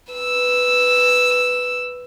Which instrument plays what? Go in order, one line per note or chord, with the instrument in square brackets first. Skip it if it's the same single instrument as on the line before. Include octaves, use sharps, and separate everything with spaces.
[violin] B4 E6